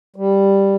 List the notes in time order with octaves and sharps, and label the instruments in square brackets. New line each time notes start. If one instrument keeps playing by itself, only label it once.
[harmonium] G3